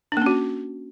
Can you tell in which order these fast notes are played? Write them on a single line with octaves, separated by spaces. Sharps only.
D4 A#3 C#4 F#4